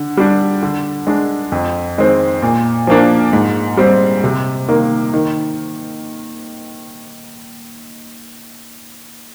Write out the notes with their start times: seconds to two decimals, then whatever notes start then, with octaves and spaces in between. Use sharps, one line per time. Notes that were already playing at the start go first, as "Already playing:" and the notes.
Already playing: D3
0.17 G3 D4
0.63 D3
1.07 G#3 D4
1.52 F2
1.98 D#3 G#3 C4
2.42 A#2
2.87 F3 A#3 D4
3.33 G#2
3.77 G3 C4
4.24 C3
4.68 D#3 A#3
5.14 D#3